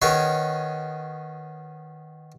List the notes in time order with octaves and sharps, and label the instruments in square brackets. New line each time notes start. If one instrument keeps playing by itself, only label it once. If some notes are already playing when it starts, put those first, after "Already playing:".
[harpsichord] D#3 B3 C#4 D#4 G#4 C#5